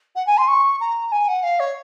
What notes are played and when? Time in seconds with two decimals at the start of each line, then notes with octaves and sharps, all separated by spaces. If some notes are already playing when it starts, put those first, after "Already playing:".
0.15 F#5
0.26 G#5
0.37 C6
0.47 C#6
0.80 A#5
1.11 G#5
1.28 F#5
1.43 F5
1.59 C#5